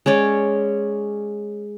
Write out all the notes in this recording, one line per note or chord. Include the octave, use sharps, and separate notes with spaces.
G#3 C#4 C#5 D5